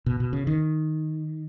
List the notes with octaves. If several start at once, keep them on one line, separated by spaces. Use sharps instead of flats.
B2
B2
C#3
D#3